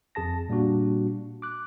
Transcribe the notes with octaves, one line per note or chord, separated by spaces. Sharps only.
F2 G#4 A5 A#6
A#2 G3 A#3 D4 F#4
D6 F#6